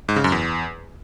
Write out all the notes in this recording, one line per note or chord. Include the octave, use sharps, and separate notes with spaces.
G#2
C#3
F#2
E2